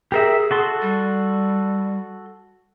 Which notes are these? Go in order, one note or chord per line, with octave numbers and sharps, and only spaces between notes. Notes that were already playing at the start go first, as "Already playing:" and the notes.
G4 G#4 A#4 E5
F#4 A4 C6
G3